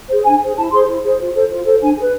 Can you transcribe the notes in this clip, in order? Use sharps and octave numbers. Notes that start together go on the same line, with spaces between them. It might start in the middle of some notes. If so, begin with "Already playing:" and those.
G#4 C5
D4 G#5
G#4 C5
E4 A5
G#4 C5 C6
E4
G#4 C5
F4
A4 C5
F4
A4 C5
D4 G#5
G#4 B4